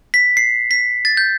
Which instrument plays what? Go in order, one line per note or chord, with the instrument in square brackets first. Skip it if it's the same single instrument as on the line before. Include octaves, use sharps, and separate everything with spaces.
[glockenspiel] B6
C7
B6
A6
G6